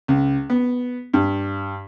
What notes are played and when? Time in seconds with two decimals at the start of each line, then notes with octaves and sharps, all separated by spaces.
0.08 C#2
0.50 B3
1.14 G2